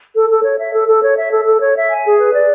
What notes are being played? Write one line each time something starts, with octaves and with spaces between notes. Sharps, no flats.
A4
A4
C#5
E5
A4
A4
C#5
E5
A4
A4
C#5
E5
G#5
G#4
B4
D5